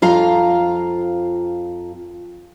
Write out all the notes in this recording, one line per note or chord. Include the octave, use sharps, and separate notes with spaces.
F2 F4 F5 A#5